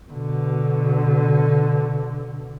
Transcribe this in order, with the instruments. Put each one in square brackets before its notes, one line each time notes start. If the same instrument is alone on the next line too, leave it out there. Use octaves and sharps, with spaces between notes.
[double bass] B2 D3